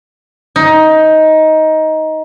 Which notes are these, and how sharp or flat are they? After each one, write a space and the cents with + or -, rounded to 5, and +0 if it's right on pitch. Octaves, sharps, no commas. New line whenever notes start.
D#4 +15